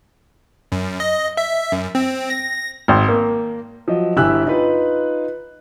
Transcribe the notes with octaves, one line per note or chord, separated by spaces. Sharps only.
F#2
D#5
E5
F#2
C4
A#6
G#1
A#3
F3 F#3 D#5
G1 E4 G4 G#5 E6 F#6
D#4 F4 B4